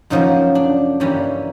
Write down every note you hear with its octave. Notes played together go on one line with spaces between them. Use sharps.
F#2 C#3 F3 A#3 D#4
D4
G2 E3 G3 A#3 C#4